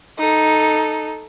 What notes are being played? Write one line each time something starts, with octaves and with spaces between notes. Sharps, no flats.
D#4 A4